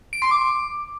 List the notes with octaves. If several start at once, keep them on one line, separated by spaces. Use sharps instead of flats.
D7
C6
D6